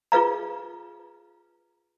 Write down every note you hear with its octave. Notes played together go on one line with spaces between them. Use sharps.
F4 G#4 B4 F5 A#5